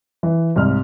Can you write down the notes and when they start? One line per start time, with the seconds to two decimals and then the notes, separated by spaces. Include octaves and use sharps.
0.23 E3
0.56 C2 G#2 F6